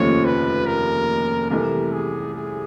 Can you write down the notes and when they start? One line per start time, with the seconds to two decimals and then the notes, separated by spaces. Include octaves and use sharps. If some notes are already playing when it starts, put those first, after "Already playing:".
Already playing: F1 D#2 C#3 F3 A3 C#5
0.25 B4
0.66 A#4
1.50 C2 C3 E3 A3 A#4
1.92 G#4
2.34 G#4